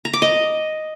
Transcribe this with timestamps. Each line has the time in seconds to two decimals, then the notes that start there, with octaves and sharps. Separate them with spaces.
0.05 A#5
0.13 D6
0.22 D#5